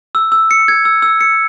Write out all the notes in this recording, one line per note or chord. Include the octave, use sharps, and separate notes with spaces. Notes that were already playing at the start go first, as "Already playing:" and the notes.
E6
E6
C#7
G#6
E6
E6
C#7